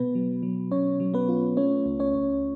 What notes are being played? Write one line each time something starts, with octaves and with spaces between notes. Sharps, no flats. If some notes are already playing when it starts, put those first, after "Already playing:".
Already playing: B2 B3 B4
F#3
F#3
B2 C#4 C#5
F#3
B3 B4
F4
A3 C#4 C#5
C#2
C#4 C#5
C#2